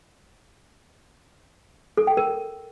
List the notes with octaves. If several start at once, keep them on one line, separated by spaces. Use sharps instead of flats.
A4
G5
A#4